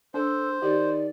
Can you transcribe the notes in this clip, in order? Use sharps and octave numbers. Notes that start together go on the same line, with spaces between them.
D4 A4 C5
D#3 G4 D5